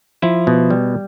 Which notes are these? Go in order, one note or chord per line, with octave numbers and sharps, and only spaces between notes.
F3 E4
B2
G3